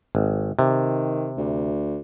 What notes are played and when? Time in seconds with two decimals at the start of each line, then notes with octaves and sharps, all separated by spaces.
0.15 G#1
0.59 C3 D#3
1.37 D2